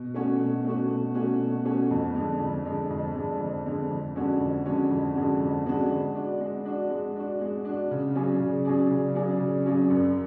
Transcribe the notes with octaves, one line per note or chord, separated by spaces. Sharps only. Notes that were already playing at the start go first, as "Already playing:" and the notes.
Already playing: B2
A3 C#4 F#4
B2
A3 C#4 F#4
B2
A3 C#4 F#4
B2
A3 C#4 F#4
F2
D3 G#3
F2
D3 G#3
F2
D3 G#3
F2
D3 G#3
F2
D3 G#3 C#4 F#4
F2
D3 G#3 C#4 F#4
F2
D3 G#3 C#4 F#4
F2
D3 G#3 C#4 F#4
G#3
D4 F#4
G#3
D4 F#4
G#3
D4 F#4
G#3
D4 F#4
C#3
F#3 C#4 G#4 D5
C#3
F#3 C#4 G#4 D5
C#3
F#3 C#4 G#4 D5
C#3
F#3 C#4 G#4 D5
F#2